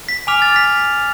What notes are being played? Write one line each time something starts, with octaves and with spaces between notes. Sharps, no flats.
B6
G#5 D6 F6 F7
A6
B6